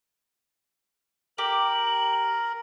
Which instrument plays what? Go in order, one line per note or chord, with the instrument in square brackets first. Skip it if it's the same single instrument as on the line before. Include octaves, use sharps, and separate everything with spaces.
[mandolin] G4 [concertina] A#4 [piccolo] F#7